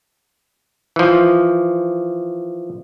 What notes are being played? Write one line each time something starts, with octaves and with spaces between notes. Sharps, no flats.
E3 F3